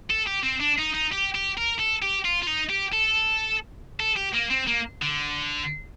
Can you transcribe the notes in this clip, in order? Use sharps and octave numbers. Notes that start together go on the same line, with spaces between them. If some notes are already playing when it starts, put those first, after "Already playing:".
A4
G4
C4
D4
D#4
D#4
G4
G4
A#4
A4
G4
F4
F4
D#4
G4
A4
A4
G4
A#3
C4
A#3
D3